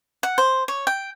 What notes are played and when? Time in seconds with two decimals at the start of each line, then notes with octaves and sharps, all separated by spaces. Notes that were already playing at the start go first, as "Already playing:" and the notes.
0.23 F#5
0.38 C5
0.68 C#5
0.87 G5